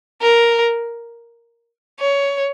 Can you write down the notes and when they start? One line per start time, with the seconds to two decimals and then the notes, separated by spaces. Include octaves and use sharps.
0.21 A#4
2.00 C#5